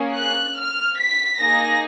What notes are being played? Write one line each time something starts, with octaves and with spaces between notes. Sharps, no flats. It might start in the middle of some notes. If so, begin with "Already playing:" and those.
Already playing: A#3 C#4 G#4
F#6
F6
B6
A#3 D#4 G#4 A#6